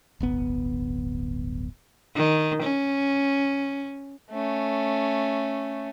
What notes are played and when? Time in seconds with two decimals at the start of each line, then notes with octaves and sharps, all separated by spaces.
0.20 D1 G1 B3
2.15 D#3
2.63 C#4
4.31 A3 C#4